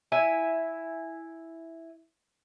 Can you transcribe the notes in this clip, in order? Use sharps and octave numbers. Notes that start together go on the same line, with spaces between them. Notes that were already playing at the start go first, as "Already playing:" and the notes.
E4 E5 G#5